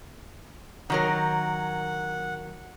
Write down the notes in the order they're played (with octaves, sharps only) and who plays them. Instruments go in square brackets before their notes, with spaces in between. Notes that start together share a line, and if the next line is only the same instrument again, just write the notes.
[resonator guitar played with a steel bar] D#3 F#3 A#4 [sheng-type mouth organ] F#5